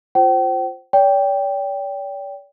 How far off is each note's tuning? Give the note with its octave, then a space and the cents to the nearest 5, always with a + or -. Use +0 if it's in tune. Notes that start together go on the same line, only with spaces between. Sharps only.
F4 +0 C5 +0 G5 -40
D5 -45 G5 +0